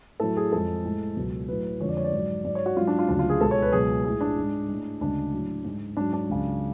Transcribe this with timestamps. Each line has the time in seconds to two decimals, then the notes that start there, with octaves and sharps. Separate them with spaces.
0.20 A2 F#3 A4
0.37 G#4
0.52 F2 F3 G#3 A4
0.84 A2 G#3
1.16 C#2 B2 F#3
1.48 A2 F#3 B4
1.80 F2 D3 F3 G#3 C#5
1.88 D5
1.97 C#5
2.04 D5
2.12 G#2 F#3
2.44 G#2 F#3 D5
2.55 C#5
2.66 F#4
2.77 G#2 F#3 F4
2.87 D4
2.99 F4
3.09 D2 C#3 F#3 D4
3.19 F4
3.30 G#4
3.41 C#2 B2 G#3 A4
3.51 C#5
3.62 B4
3.72 C#2 B2 F#3 G#4
4.04 A2 G#3 G#4
4.21 D4
4.37 G#2 G#3
4.69 A2 G#3
5.01 D2 C#3 G#3 D4
5.34 A2 F#3
5.65 G#2 G#3
5.97 G#2 F#3 D4
6.13 D4
6.29 C#2 C#3 F#3